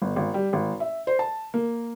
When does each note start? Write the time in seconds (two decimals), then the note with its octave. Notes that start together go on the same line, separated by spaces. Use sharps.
0.02 G1
0.16 G#1
0.34 G3
0.53 G#1
0.80 E5
1.07 C5
1.19 A5
1.54 A#3